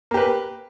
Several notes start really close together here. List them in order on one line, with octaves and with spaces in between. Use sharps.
A#3 G4 B4